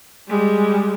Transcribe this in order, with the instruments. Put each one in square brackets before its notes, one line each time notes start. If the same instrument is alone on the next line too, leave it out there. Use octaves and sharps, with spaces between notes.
[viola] G3 G#3